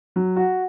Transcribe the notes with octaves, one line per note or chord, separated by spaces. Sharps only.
F#3
F#4